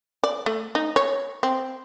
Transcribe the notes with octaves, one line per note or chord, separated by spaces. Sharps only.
D5
A3
D#4
C#5
C4